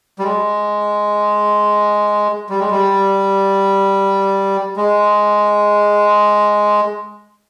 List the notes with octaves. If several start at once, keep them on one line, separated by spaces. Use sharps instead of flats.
G3
G#3
G3
G#3
G3
G#3